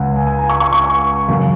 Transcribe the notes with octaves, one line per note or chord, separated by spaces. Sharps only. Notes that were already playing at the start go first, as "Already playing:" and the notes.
Already playing: C#2 C#3 F#5 G#5
G#5
G#5
A#5
C#6
C#6
C#6
F#2 C#3